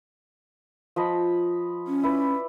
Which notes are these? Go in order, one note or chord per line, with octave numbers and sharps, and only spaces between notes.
F3 D#5 B5
C#4
E4 B4 D5